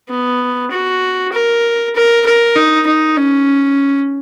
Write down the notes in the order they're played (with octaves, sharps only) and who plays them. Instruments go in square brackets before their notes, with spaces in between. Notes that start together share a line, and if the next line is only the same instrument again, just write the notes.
[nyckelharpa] B3
F#4
A#4
A#4
A#4
D#4
D#4
C#4